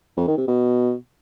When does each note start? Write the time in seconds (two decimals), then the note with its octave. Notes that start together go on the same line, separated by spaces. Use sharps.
0.17 F2
0.27 D#3
0.37 C3
0.47 B2